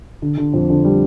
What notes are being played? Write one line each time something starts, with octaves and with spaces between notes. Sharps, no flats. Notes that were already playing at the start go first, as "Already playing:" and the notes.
D3
D3
F2
D3
G3